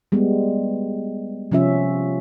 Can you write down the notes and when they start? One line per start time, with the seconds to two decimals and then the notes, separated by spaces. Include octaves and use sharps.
0.12 G3 G#3 B3
1.52 C3 F3 C#4 F4 E5